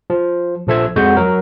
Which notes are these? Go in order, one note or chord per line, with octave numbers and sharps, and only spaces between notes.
F3
A#1 F3 A4 E5 G#6
F2 G#3 F#4 F#5 G6
F#3 A#4